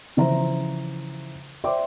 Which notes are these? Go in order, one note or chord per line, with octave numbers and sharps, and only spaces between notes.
C#3 E3 F3 C5 E5 A#5
C5 D5 E5 G5 C6 D6